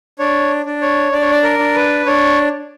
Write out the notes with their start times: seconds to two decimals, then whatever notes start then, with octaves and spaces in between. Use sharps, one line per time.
0.19 D4 C#5
0.66 D4
0.82 C#5
1.12 D4 D5
1.21 C#5
1.32 D5
1.43 A#4
1.59 D4
1.75 B4
2.06 D4 C#5